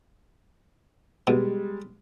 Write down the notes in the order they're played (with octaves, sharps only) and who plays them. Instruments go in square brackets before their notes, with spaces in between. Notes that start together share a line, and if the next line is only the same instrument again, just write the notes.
[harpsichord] B2 [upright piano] G3 G#3